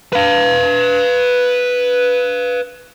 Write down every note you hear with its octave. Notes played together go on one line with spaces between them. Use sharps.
B4 F5